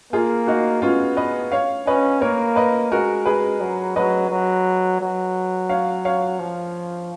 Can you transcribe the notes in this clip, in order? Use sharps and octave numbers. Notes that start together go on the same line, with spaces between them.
A#3 F4 G#4
D#4 F#4
B3 C#4 F4
B4 D#5
C#5 F5
C#4 B4 D#5
A#3 A#4 C#5
B4 D#5
G#3 F#4 A#4
G#4 B4
F#3
F#3 B4 D#5
F#3
F#3
C#5 F5
C#5 F5
F3